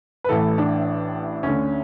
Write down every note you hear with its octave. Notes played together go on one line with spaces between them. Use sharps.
B4
A1 A2 E3 A4
D4
D2 D3 C#4